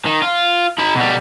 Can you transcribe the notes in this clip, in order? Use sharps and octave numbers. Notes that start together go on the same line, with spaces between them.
D#3
F4
D#4 B5
B2 G3